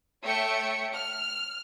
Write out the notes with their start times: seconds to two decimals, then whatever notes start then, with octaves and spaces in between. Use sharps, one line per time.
0.24 A3 C#5 E5 G5 C#7
0.93 F6